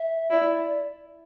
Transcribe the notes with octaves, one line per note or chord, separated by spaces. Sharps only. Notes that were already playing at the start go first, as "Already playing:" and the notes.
Already playing: E5
E4 D5